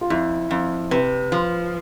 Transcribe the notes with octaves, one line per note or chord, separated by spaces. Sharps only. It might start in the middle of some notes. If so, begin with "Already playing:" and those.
F4
F2 E4
F2
C3 B4
F3